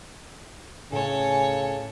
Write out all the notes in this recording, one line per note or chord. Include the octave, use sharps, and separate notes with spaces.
A2 C#3 A4 C#5 G#5